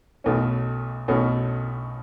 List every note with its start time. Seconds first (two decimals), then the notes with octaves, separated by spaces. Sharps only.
0.24 B1 B2 A3 C#4
1.08 B1 B2 A3 C#4